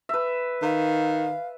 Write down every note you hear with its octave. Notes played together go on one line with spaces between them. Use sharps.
B4 E5
D#3 F5